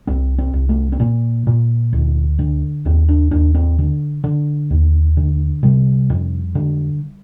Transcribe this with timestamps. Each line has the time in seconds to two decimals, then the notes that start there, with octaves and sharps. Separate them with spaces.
0.07 C2 C4
0.38 C4
0.53 C2
0.69 A3
0.92 C4
1.00 A#2 A#3
1.47 A#2
1.93 D2
2.39 D3
2.85 D#2 C4
3.08 D4
3.31 D#2 D4
3.55 C4
3.79 D3
4.24 D3
4.70 D#2
5.17 D3
5.63 C3 G3
6.10 F2
6.55 D3